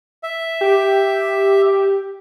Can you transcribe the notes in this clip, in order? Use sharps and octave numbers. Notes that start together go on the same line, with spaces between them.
E5
G4